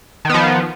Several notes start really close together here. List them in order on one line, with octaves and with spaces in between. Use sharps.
D#3 B3 F3